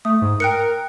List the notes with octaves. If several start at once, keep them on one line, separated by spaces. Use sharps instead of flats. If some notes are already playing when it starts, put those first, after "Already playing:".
A3 D#6
G#2
A#4 G5 F#6 C#7